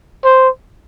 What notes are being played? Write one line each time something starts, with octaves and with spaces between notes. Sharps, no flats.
C5